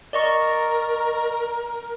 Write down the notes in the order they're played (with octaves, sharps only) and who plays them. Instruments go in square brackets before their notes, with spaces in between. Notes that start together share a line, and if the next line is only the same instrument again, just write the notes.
[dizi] A#4 [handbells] D5 D#5 C#6